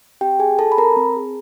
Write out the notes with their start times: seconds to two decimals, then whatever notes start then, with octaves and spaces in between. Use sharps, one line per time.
0.21 C4 G4 G5
0.39 G#4 G#5
0.59 F4 A4 A5
0.72 B5
0.77 C4 A#4 A#5
0.96 C4
1.16 G#4